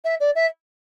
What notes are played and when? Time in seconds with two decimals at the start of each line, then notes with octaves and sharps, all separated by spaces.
0.05 E5
0.20 D5
0.35 E5